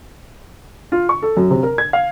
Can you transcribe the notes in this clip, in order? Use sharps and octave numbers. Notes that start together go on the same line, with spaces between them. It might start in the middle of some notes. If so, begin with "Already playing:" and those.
F4
C#6
A4
F#2
C3
A#4
G#6
F5